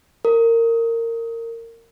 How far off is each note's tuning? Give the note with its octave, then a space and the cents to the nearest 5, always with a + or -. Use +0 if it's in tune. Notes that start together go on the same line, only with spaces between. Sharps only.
A#4 -20